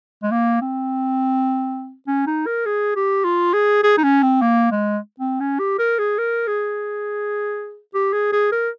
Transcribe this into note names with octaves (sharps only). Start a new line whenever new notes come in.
G#3
A#3
C4
C#4
D#4
A#4
G#4
G4
F4
G#4
G#4
D#4
C#4
C4
A#3
G#3
C4
C#4
G4
A#4
G#4
A#4
G#4
G4
G#4
G#4
A#4